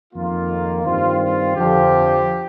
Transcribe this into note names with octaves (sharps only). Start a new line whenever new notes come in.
F2 D#3 A#3 F4
G2 D#3 G3 C4 F4
F4
F2 D3 F3 G4